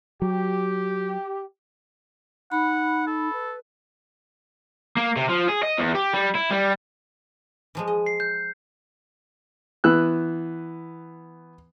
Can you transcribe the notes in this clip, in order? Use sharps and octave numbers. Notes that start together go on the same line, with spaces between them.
F#3 G4
D#4 F#5 B5
A4
B4
A#3
C3
F3
G#4
D#5
E2
G4
G3
E4
G3
E3 F3 G#3
D#5
C7
G6
E3 B3 E6 F#6